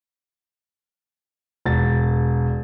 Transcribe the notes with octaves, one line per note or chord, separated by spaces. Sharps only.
E1 A6